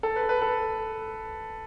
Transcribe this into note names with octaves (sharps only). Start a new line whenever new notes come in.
A4
B4
B4
A4